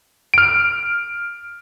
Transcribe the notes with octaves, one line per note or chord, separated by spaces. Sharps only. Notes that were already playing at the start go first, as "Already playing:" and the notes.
F6 D7